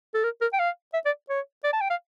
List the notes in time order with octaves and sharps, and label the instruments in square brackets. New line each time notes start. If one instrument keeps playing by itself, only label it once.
[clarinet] A4
A#4
A#4
G5
F5
E5
D5
C#5
D5
A5
G5
F5